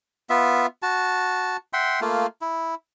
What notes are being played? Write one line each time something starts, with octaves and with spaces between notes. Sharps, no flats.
B3 F4 E5
F#4 A5
E5 F#5 G5 C6
A3 A#3 F4
E4